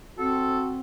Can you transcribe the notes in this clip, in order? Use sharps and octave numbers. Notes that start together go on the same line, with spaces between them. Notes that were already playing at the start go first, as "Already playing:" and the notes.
C4 F#4 A4